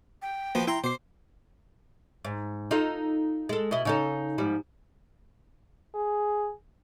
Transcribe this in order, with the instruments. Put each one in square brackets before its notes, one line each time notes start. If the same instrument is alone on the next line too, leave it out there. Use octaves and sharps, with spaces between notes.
[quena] G5
[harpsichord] F3 B3 F#4 [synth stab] A#3
[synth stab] E4 [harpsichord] G5 C6 [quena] A#5
[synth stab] B2 C7 [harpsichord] C5 [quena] D6
[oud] G#2
D#4 F4 A4
G#3 A4
B2 E4 D#5
C#3 D#4 A4
G#2 F3 G3
[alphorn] G#4